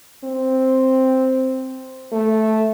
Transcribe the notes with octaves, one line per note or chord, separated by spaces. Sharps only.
C4
A3